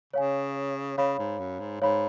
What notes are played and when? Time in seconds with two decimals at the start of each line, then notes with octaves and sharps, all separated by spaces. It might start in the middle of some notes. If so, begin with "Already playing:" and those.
0.13 C#3 C#5 F5 G#5
0.98 C#3 C#5 F5 B5
1.19 G#2
1.39 F#2
1.60 G#2
1.81 G#2 C#5 F5 B5